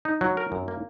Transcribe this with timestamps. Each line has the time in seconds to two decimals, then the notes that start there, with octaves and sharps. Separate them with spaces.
0.05 D#4
0.21 F#3
0.37 A#4
0.52 F#2
0.68 A#3